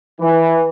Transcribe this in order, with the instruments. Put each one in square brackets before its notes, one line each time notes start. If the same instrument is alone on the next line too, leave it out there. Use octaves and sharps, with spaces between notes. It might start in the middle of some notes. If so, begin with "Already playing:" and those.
[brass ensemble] E3